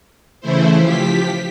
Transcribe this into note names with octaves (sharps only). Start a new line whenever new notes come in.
C#3 E3 A3 E4 C5
F3 G4 B6